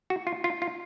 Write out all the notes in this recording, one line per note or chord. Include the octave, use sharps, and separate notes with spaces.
F#4
F4
F4
F4